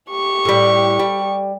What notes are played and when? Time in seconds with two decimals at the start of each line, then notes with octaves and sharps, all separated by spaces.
0.11 G4 C#6
0.45 A2 G3
0.99 G3